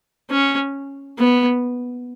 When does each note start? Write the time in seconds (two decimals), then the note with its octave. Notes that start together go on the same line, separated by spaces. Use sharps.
0.30 C#4
1.19 B3